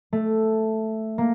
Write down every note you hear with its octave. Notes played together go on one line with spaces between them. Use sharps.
A3
A#3